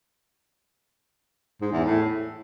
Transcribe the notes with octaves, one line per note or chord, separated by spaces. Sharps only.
G#2
E2
A2